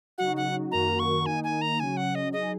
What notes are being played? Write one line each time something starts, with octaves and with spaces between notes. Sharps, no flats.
C#3 F#3 D#4 F#4 F#5
F#5
F#2 D#3 A#3 F#4 A#4 A#5
C#6
D#3 A#3 D#4 G#5
G#5
A#5
C#3 F#3 C#4 G#5
F#5
D#5
F#3 D#4 G#4 D#5